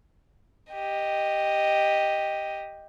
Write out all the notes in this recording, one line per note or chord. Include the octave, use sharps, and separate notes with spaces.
G4 D#5